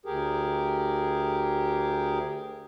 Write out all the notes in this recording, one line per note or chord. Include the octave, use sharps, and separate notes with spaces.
D2 G4 G#4 A#4